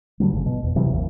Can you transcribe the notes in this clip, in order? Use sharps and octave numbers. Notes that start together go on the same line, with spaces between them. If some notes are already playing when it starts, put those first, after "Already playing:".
G2 D3 F#3 G3
G1 C#3
B2
E2
C3 E3 F#3
G1 D#2